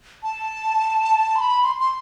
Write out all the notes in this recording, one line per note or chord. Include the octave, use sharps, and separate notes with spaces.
A5
C6
B5
C6
C6